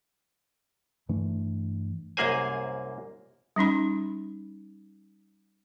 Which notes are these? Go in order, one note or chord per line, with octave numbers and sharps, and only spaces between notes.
G2 E3 A3 D4
C2 F#2 A#3 G#4 C5 G#5
G3 C#4 D#4 B5